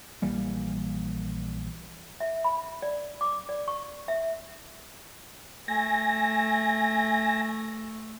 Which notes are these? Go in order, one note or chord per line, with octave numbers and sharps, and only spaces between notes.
A#1 E3 G3 A#3
E5
B5
D5
D6
D5
C#6
E5
A3 G#5 A#6